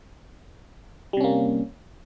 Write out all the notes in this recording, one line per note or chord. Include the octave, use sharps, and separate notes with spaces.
C3 G3 A#3 C#4